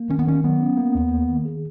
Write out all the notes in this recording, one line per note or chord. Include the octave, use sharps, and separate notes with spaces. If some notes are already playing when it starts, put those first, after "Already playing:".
Already playing: A#3
D#3 C#4
B3
D#3 C#4
F#3 B3
C#4
A#3
D#2
A#3
D#3
G#4